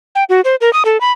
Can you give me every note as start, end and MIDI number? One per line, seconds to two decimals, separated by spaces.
0.15 0.24 79
0.29 0.41 66
0.45 0.56 72
0.61 0.73 70
0.73 0.83 87
0.85 1.00 69
1.01 1.12 83